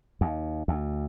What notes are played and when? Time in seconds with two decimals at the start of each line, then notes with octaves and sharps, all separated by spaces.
0.21 D#2
0.68 D2